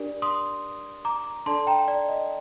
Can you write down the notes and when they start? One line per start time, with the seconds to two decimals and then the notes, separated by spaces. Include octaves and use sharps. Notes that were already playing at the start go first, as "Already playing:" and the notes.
Already playing: D4 G4 A#4 D5
0.22 C6 D#6
1.05 A#5 D6
1.46 D4 A4 D5 A5 C6
1.67 G5 A#5
1.88 D5
2.09 D#5